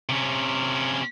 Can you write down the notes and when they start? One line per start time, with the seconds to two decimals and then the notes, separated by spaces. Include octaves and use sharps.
0.09 C3 C#4